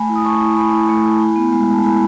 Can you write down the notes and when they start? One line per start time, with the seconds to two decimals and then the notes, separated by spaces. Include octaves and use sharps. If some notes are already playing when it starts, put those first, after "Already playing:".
Already playing: A3 G#5 B5
0.09 E4
0.15 D#6
0.25 A3 A5 C#6
0.42 E4
0.56 A3 G#5 B5
0.73 E4
0.89 A3
1.05 E4
1.20 E4
1.36 B3
1.52 G#3
1.68 G#3
1.73 A5
1.84 E4 G#5 B5